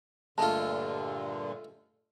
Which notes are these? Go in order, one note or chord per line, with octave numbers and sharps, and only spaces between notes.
G2 A#2 D3 G#3 A3 F4 A5